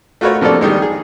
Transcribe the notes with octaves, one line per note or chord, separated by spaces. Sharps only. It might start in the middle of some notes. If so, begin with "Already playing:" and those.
A3 F4 F#4 A#4 B4 C#5
C3 F3 A#3 A4 D5
D#3 G3 G#3
G#4